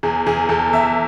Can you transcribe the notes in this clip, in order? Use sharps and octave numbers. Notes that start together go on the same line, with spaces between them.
E2 G#4
E2 G#4
E2 A4
E2 E5